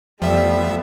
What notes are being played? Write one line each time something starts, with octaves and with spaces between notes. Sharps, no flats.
F2 F3 G3 A3 B3 E5